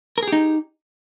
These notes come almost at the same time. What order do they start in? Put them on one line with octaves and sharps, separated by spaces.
A#4 G#4 G4 D#4